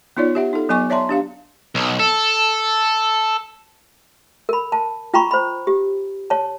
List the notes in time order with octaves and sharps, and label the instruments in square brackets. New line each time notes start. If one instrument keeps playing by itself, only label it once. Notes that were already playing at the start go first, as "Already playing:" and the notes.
[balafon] B3 D#4 F4 C#5 D5
G4 E5 F#5
D#4 A4
F#3 B3 D#5 G#5 C#6 D6
C#5 D5 E5 A5 A#5 C6
D4 G4 F5
[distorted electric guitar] B1
A4
[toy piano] A#4 B5
A5
F4 G5 A#5 B5 C#6
C5 B5
G4
C#5 A5